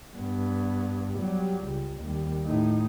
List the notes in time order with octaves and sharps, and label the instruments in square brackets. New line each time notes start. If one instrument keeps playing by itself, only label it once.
[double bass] G2 B3
F#3 G3
C#2
D#2 G3
A2 D#4